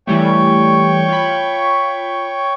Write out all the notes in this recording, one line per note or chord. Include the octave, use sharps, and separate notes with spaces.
E3 G3 A3 C#5 G5 C#6
F4 B5